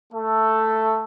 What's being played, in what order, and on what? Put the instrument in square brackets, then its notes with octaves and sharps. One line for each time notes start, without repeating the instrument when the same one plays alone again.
[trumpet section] A3 A4